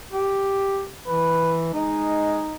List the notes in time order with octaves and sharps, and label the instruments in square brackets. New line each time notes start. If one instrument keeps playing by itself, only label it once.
[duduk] G4
[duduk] E3 [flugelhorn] B4
[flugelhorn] G#3 [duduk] D#4